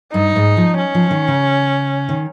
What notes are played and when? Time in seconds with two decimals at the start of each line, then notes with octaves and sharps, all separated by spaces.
0.13 G2 D#4
0.36 G#2
0.57 F3
0.78 C#4
0.95 F3
1.11 D#3
1.28 C#3
2.09 D#3